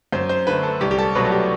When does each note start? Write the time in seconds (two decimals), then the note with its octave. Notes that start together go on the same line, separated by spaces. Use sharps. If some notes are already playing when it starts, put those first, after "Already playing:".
0.12 F#2 C5
0.29 C5
0.47 D3 A3 B4
0.63 A4
0.81 C2 G4
0.91 G4
0.98 A4
1.15 B2 F#3 A3 B4
1.25 A4
1.32 G4